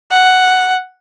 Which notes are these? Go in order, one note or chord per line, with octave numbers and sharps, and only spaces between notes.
F#5